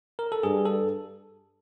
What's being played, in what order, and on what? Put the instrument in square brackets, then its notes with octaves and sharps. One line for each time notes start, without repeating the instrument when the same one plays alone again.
[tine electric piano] A#4
A4
[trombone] G2 [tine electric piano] G#4
[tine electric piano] A4